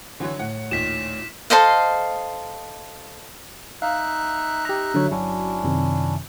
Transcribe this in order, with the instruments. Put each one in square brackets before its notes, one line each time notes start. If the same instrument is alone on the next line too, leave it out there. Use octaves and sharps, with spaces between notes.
[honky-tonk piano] D3 F#3 C#5 [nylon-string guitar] E3
[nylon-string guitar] A2 [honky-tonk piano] F#5
[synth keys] D#2 [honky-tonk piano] A#2 D#3 [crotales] B6 E7
[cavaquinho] A4 C5 D#5 F5
[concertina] D#4 E5 F#6 [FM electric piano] F5
[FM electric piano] G4 A#5
D3 F#3 C#5
[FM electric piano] G1 F#3 F#4 [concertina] C#4 D4 E4
[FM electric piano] F#2 C3 D#3